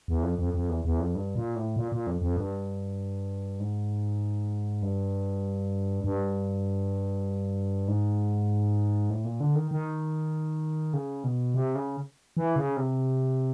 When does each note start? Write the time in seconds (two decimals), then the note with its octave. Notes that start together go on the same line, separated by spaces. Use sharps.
0.08 E2
0.23 F2
0.39 F2
0.54 F2
0.69 E2
0.85 E2
1.00 F2
1.15 G2
1.35 A#2
1.56 A2
1.76 A#2
1.92 A#2
2.07 F2
2.22 F2
2.37 G2
3.60 G#2
4.83 G2
6.04 G2
7.88 G#2
9.10 A2
9.25 A#2
9.40 D3
9.55 D#3
9.71 D#3
10.94 C#3
11.24 B2
11.54 C3
11.75 C#3
12.37 E3
12.56 C#3
12.77 C3